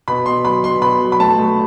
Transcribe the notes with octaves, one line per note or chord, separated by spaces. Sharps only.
B2 B5
B2 C6
F#3 B5
B2 C6
B2 B5
F#3
B5
A3 A5
A3